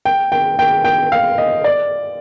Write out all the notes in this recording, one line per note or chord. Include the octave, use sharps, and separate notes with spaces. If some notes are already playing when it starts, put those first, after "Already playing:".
G5
G5
G5
G5
F5
D#5
D5